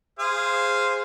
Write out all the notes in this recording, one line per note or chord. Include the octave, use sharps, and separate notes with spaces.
G#4 C5 F5